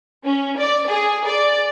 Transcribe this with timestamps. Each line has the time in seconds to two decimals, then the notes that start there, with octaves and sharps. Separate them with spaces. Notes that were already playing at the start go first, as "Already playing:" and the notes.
0.25 C#4
0.57 D5
0.88 G#4
1.25 D5